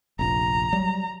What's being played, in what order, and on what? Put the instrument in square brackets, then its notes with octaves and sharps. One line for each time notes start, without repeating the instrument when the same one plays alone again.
[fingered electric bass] F1 A#1 [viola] A#5
[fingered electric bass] F#3 G3